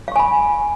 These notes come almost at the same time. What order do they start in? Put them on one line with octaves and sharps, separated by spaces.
F5 C#6 G#5 B5